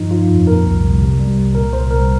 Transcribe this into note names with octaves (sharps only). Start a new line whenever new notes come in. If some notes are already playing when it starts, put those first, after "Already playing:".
Already playing: G2 F3 D#4
F3 F4
F2
A#2 A#4
C2
C2
C3
G3
C2
A#2 A#4
C2 C5
C2 A#4